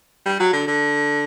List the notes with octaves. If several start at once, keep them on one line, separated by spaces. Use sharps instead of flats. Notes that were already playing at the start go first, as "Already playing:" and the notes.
G3
F#3
D3
D3